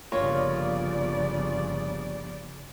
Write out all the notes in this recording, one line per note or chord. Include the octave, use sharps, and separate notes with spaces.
G1 C#3 F3 A#3 B3 F4 C#5 D5